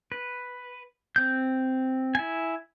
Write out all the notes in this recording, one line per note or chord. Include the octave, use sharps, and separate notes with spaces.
B4
C4 G6
E4 G#5